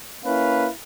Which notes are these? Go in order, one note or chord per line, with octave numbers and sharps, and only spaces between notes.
A#3 C#4 E4 B4 F5